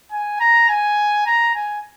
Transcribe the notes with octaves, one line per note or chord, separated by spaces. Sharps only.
G#5
A#5
G#5
A#5
G#5